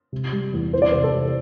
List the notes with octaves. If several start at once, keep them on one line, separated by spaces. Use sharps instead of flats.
C3
G3
E2
E3 C5
D5
C3 C5
A4
C3